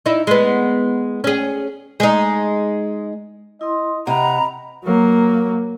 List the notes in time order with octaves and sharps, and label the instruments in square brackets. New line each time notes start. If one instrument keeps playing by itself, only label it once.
[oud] D#4 E4
G#3 B3
C#4 G#4
G#3 D#4
[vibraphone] E4 C6 [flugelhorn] D#5
[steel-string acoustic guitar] C3 [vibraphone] D#5 B5 [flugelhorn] F#5 [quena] A#5
[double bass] F#3 A#3